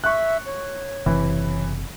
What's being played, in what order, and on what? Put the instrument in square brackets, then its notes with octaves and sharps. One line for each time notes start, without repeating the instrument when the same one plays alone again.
[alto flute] E5 [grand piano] C#6 F#6
[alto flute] C#5
[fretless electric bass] F#1 C3 [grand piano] E3